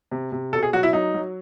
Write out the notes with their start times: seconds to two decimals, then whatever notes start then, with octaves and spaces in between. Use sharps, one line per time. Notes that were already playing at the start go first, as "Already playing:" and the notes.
0.11 C3
0.32 C3
0.53 B2 A4
0.63 G#4
0.73 F#3 F#4
0.83 E4
0.93 F#3 D#4
1.14 F#3